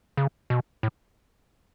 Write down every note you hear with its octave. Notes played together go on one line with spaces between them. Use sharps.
C#3
B2
A2